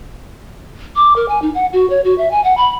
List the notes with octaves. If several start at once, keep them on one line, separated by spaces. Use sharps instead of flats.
D6
A#4
G#5
D#4
F#5
F#4
C#5
F#4
E5
G#5
F#5
B5